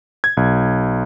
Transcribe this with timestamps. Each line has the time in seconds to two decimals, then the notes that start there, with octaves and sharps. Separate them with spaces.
0.24 G#6
0.37 B1